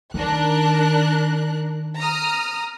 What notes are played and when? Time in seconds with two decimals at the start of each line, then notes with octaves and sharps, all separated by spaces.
0.14 D#3 D4 A#4 F#6
1.99 A#5 D#6 F6